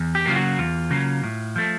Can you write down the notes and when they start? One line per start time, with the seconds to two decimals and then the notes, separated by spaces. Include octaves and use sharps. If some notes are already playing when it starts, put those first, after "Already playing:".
Already playing: E2
0.15 G4
0.25 C#3 F#3 A#3 F4
0.36 F#4
0.58 E2 F4
0.91 C#3 F#3 A#3
1.24 A2
1.56 F3 A3